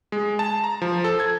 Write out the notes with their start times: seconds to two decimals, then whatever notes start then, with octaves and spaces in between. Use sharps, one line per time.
0.12 G#3
0.39 A5
0.64 A#5
0.82 F3
1.04 A4
1.20 G#6